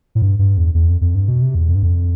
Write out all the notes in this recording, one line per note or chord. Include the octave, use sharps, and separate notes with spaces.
A2
G2
G2
E2
E2
F2
F2
G2
B2
C3
E2
F2
G2
F2